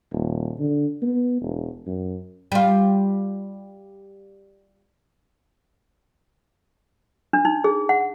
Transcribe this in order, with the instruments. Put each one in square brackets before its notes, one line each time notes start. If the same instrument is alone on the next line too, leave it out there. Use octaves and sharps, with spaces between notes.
[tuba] D#1
D3
B3
E1
F#2
[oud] G3 F4
[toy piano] D4
D#4
G#4
F#5